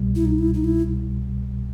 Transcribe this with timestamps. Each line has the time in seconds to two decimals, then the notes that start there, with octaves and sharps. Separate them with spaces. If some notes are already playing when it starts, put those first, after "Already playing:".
Already playing: C2 B2 G3
0.15 E4
0.25 D#4
0.39 E4
0.54 D#4
0.64 E4